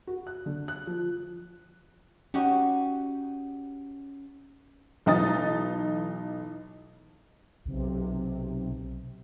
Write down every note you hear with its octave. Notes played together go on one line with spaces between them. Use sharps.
F#4
F#6
D3
F#6
F3
C#4 D#4 F#4 G4
B1 E3 D#4 D#6 A6
B1 C3